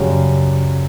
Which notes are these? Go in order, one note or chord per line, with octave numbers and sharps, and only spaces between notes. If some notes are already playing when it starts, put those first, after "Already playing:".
Already playing: F#2 C#3 G3